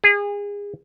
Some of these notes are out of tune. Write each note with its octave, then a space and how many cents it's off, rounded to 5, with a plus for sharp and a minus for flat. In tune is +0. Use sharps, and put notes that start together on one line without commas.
G#4 -30